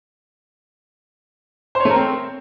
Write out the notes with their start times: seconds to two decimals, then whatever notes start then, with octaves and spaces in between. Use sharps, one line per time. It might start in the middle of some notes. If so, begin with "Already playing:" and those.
1.75 C5
1.80 C#5
1.85 A3
1.90 A#4
1.95 C4